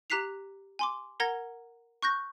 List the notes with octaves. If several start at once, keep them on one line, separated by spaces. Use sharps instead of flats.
G4 A#5 F#6 B6 C7 F7
G#5 C6 D6
A#4 F#5 A#5 G#6 A#6
C#6 F#6 G6 A#6